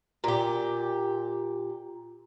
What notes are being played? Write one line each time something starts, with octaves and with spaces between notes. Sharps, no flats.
A#2 G4